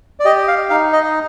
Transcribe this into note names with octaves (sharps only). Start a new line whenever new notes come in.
D5
G4 D#5
F5
D#4 F5
D#5